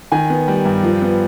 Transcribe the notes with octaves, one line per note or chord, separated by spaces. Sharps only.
D#3 G#5
B3
G3
G2
F3
B3